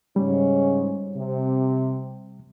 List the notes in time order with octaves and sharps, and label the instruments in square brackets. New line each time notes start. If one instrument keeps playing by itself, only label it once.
[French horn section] G#2 C#3 C#4 [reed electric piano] G3
[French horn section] C3